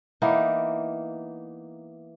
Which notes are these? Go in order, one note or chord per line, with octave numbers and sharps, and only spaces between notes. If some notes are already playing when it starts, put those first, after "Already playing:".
E3 A#3 B3 D#4